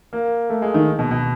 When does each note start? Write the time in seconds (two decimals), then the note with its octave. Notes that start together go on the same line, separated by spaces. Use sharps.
0.13 A#3
0.50 A3
0.62 G#3
0.74 D#3
0.99 B2
1.11 B2